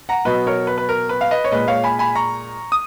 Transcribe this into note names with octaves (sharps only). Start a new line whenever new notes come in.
F#5 A#5
B2 F#3 B4 D#5
A#4 C#5
B4
B4
A#4
B4
F5
B4 D#5
C#5
A#2 G#3 B4 D#5
C#5 F5
G#5 B5
G#5 B5
A#5 C#6
D#6